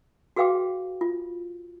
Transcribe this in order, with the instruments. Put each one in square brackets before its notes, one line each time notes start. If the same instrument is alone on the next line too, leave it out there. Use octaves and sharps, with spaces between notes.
[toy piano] F#4 G#4 B4 F5 G5 D6
F4